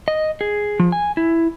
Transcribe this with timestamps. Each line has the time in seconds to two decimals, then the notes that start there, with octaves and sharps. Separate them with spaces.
0.08 D#5
0.41 G#4
0.79 F3
0.92 G#5
1.17 E4